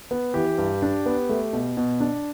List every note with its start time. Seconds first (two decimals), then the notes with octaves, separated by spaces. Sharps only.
0.11 B3
0.34 E3 G4
0.58 G2
0.82 D4
1.06 B3
1.29 A3
1.53 B2
1.77 B2
2.00 D4